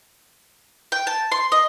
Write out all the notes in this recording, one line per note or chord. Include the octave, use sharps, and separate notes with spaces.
G5
A5
C6
D#5